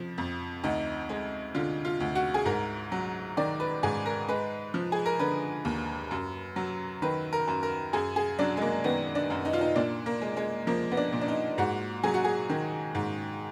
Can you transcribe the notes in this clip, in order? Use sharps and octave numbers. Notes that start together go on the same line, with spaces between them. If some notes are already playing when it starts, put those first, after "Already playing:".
Already playing: F2 F3
F2
D2 D#4
G#3
D3 F4
F4
D2
F#4
G#4
G#2 A#4
F#3
D#3 D5
B4
G#2 G#4
A#4
G#3 B4
F3
G#4
A#4
D3 B4
D#2
F#2
F#3
D#3 B4
A#4
F#2
A#4
F#2 G#4
G#4
F#3 D4
G#3
A#3
D#3 B3
D4
F#2
D#4
F4
D#4
A#2 D4
A#3
G#3
G#3
F3 A#3
B3
D4
A#2
D4
D#4
G#2 F#4
F#3 G#4
F#4
G#4
D#3
G#2